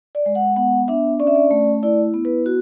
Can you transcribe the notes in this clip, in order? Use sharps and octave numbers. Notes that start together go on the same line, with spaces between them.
D5
G#3
F#5
B3 F#5
D4 E5
C#4 D5
E5
D5
A3
E4 D5
B3
B4
F#4